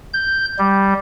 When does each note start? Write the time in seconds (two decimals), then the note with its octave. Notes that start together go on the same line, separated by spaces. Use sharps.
0.14 G6
0.59 G3